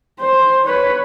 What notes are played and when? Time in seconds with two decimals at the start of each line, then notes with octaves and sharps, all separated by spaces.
0.20 C5
0.65 B4 C#5